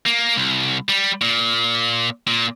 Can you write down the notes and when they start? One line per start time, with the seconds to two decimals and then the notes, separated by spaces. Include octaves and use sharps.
0.06 A#3
0.37 C2
0.89 G3
1.22 A#2
2.27 A#2